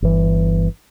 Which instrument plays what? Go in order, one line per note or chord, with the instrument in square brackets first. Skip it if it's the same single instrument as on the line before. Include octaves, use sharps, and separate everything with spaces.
[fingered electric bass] G1 E3